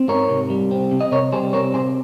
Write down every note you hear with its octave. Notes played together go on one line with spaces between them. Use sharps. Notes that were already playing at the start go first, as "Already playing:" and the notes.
Already playing: C4
G#2 A#4 C#5
C3
G3
C4
C3
D#5
C3 A#4 C#5
G3 G#4 C5
C4 A#4 C#5
C3 G#4 C5